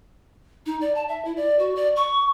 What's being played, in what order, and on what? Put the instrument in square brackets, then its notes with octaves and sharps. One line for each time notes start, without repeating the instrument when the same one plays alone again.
[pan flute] D#4
D5
A5
E5
E4
D5
F#4
D5
C#6